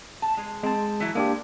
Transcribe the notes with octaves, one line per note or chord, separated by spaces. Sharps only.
A5
G#3 G#4
G#3 C4 A5
E3 F#3 E4
G#3 A#3 D4 G4